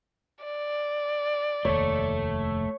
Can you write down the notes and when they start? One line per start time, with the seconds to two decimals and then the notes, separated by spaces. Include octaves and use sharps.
0.45 D5
1.65 F1 D#2 A3 A4 C#5